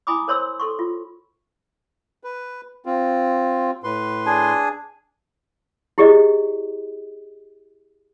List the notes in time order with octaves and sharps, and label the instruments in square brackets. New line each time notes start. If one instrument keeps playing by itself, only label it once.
[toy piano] E4 G#5 B5 D6 D#6
A#4 C5 C#5 C6 E6
A4 C6 C#6
F4
[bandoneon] B4
C4 F4
A2 B4 C6
[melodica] D4 G#4 G#5
[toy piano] E4 G4 G#4 D5 D#5